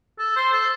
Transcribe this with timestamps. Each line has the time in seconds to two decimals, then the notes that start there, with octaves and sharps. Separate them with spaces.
0.19 A4
0.36 C5
0.53 A4